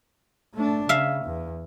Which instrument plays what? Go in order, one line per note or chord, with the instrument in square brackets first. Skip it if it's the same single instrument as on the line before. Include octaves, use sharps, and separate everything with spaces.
[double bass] A3 D4
[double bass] C#3 [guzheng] E5 F5
[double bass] E2